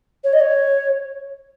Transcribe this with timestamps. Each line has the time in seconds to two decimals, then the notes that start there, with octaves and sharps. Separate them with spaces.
0.24 C#5
0.33 D#5
0.40 C#5